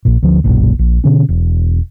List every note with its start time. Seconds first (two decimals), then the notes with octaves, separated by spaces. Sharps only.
0.05 A#1 A#2
0.23 D2 F3
0.44 F#1 B1 A#2
0.79 A#1
1.04 B2 D3 C#4
1.29 E1